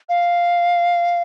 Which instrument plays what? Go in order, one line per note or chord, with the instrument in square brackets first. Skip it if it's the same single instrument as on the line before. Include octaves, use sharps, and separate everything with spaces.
[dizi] F5